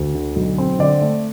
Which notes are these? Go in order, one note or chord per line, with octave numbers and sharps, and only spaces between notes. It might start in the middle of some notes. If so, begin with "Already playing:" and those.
Already playing: D2
D3
B1
C4
D3 D5
A3